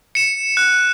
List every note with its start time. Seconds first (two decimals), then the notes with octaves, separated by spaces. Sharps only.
0.15 C#7 E7
0.57 F#6